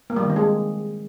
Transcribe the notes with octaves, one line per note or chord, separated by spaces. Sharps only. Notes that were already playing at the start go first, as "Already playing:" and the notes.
A#3
G3
D#3
C4
G#3